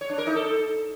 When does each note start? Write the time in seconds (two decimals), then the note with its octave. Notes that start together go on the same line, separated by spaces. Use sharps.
0.01 C#5
0.10 D4
0.18 A#4
0.27 D#4
0.35 A4